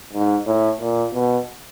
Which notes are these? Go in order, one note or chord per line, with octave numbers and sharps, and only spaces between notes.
G#2
A2
A#2
B2